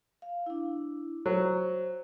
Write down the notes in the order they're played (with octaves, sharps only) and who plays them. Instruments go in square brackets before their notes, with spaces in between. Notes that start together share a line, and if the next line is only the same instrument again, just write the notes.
[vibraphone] F5
D4 E4
[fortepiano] F#3 [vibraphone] C5